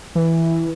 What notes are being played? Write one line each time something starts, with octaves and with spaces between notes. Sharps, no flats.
E3